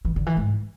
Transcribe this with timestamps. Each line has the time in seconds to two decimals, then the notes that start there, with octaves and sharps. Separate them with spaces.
0.05 E3
0.16 D3
0.26 E3
0.37 G#2